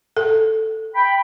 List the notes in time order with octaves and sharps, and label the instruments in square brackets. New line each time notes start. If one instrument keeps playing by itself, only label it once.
[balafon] A4
[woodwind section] G5 B5